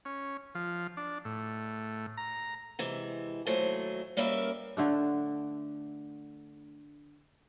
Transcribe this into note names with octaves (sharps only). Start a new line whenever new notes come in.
C#4
F3
D4
A2
A#5
C3 E3 G#3
D#2 A2 F#3 A3 C5 G#5
G3 A#3 C#4 A#4 B4 E5
D3 A3 D4